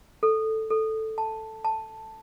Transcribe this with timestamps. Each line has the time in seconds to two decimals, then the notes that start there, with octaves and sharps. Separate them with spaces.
0.23 A4
0.70 A4
1.18 A5
1.65 A5